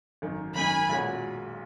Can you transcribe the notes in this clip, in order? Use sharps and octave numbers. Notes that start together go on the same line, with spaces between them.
G#1 F#2 D#3
G#1 F#2 D#3 G#5 B5
B1 A#2 G#3 C#4 F#4